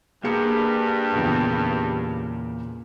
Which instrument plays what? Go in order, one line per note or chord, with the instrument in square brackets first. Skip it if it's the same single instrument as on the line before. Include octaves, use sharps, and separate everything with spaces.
[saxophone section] G2 [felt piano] A#3 G#4 C#7
[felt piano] E2 A#2 C#3